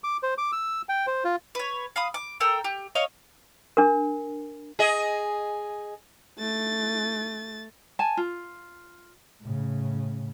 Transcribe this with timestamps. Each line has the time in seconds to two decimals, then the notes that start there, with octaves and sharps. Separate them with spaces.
0.04 D6
0.23 C5
0.38 D6
0.52 E6
0.89 G5
1.07 C5
1.25 F4
1.55 B4 C#5
1.96 F5 B5 D#6
2.14 D6
2.40 A4 A#4 G5 E6
2.64 G4
2.95 C#5 D#5 F5
3.77 D4 A#4
4.79 G#4 D#5
6.38 A3 A6
7.99 G#5 A5
8.17 F4
9.41 A2 C#3